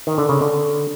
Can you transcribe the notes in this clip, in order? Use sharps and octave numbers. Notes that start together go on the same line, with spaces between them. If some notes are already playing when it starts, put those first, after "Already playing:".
D#3
D3
C#3
D3